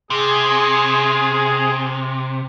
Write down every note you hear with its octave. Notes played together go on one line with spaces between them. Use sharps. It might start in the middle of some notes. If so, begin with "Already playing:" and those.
C3 G#4